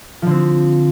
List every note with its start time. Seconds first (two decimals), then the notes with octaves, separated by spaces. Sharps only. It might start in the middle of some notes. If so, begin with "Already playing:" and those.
0.22 F3
0.26 D3
0.31 C4